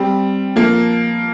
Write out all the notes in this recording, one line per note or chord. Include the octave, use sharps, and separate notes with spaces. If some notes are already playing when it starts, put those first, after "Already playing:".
Already playing: G3 C4
F3 A#3